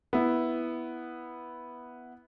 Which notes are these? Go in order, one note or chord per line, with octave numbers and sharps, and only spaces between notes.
B3 E4